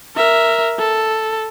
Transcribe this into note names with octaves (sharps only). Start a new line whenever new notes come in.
A#4 E5
A4